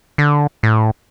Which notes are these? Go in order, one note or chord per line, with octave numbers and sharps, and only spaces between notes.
D3
A2